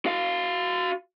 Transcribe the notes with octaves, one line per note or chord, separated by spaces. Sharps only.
F#4 F5